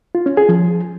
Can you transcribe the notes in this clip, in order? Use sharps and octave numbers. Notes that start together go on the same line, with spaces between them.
F4
C#4
G#4
F3